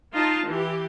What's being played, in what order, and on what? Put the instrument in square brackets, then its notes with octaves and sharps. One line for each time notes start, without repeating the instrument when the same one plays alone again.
[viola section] D#4 F4 A5
E3 G4